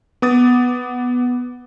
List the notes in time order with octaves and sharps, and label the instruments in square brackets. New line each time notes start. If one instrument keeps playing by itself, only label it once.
[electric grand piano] B3 D6 D#6 A6